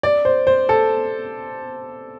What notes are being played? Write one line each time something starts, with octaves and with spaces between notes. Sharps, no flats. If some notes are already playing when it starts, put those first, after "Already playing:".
D5
C5
C5
A4